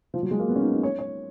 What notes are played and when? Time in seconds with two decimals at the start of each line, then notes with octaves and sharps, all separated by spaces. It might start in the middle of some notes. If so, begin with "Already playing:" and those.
0.14 F3
0.23 F#3
0.31 G#3
0.39 A#3
0.49 B3
0.56 C#4
0.61 D#4
0.72 D#4
0.83 C#5
0.99 C#5